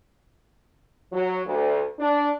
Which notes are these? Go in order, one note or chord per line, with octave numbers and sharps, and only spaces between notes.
F#3
D2
D4